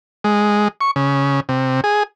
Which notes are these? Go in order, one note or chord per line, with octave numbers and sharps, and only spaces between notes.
G#3
C#6
C#3
C3
G#4